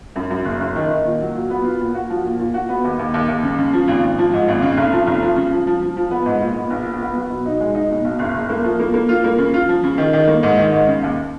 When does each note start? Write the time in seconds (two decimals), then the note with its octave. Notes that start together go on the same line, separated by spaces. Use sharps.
0.16 F#2
0.30 F#2
0.45 F#1
0.60 F#1
0.76 D#3
0.90 D#3
1.05 A#2
1.21 F#3
1.35 A#2
1.50 B3
1.64 F4
1.80 A#2
1.95 F#4
2.10 F3
2.25 A#2
2.40 A#2
2.54 F#4
2.69 B3
2.84 D#2
2.99 D#2
3.14 D#2
3.29 D#2
3.43 C#3
3.59 C#3
3.73 F3
3.88 G#1
4.03 G#1
4.18 F3
4.33 G#2
4.48 G#1
4.62 C#3
4.77 F1
4.92 F3
5.07 F1
5.22 F3
5.36 C#3
5.52 F3
5.67 F3
5.82 F3
5.97 F3
6.11 B3
6.26 G#2
6.41 A#2
6.56 B3
6.70 A#1
6.86 A#2
7.01 B3
7.16 F#3
7.30 B2
7.46 D#4
7.60 G#3
7.75 D#4
7.91 B2
8.04 B1
8.19 F#1
8.35 F#1
8.49 A#3
8.64 F3
8.80 A#3
8.94 A#3
9.09 F4
9.24 A#3
9.38 C#3
9.54 F4
9.69 F3
9.84 C#3
9.98 D#3
10.13 D#3
10.28 A#3
10.43 G#2
10.58 D#3
10.72 G#2
10.87 C#3
11.03 D#2